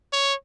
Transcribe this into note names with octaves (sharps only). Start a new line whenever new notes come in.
C#5